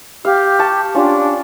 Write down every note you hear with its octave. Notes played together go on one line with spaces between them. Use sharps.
G4 F5
A5 C#6
C#4 D4 F4 G4